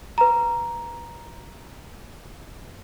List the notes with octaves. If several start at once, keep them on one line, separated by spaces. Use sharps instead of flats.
B4 A#5